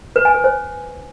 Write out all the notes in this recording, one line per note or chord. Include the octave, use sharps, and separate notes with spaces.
B4
G#5
B4
C5